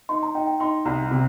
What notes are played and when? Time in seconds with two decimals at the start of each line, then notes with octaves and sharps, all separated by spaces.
0.09 D#4 C6
0.23 A#5
0.35 D#4 G5
0.47 G5
0.60 D#4 C6
0.85 C2 A#5
1.11 C3